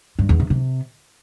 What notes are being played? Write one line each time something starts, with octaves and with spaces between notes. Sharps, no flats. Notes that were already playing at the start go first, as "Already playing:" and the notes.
G2
E2
C3
C3